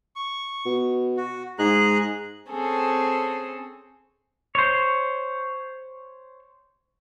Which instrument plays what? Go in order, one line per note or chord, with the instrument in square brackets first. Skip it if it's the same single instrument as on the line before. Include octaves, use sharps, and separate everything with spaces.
[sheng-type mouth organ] C#6
[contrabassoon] B2
[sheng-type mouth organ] F#4
[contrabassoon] G#2 [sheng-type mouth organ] G#4 A#5 F#6
[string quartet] C4 C#4 G#4 A4
[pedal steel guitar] C5 C#5